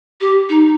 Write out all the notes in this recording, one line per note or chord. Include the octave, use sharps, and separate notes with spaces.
G4
D#4